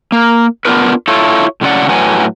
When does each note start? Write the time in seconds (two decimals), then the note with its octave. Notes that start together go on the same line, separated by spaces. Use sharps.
0.12 A#3
0.65 B3 C#4 D4 F4 A#4 B4
1.08 E4 F4 A4 C#5
1.61 A2 C#3 F#3 C5 D5 F#5
1.88 A2 F#3 B4 F#5 G#5